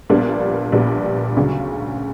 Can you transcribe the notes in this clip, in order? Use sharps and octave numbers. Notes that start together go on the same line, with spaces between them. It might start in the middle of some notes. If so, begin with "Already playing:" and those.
A#1 A#2 G3 B3 D4
A#1 A#2 G3 B3 D4
D2 C#3 F#3